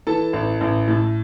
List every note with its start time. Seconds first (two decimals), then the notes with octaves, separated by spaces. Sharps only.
0.07 E3 A4 A5
0.33 A1
0.61 A1
0.88 A2